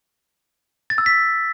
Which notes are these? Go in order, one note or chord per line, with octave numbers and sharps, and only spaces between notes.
A6
E6
B6